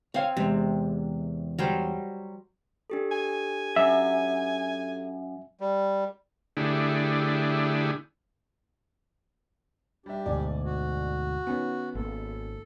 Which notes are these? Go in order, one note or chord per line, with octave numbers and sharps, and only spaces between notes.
C4 C#5 F5 G#5
E2 C3 G#3
F#3 G3 C5
D4 G4 A4
G#5
F#2 E5
G3
D3 A3 D4 E4 G4 G#4
G3 D4 G4 E5
D2 G#2 B2 D5 G#5
F#4
D#3 B3 C#4
G#1 A#3 A4